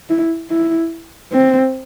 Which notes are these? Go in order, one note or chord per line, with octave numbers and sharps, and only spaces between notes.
E4
E4
C4